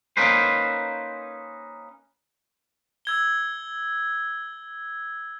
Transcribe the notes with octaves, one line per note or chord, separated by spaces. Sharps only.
A#3 C#4 D#4 B4 C5
E6 G#6 G7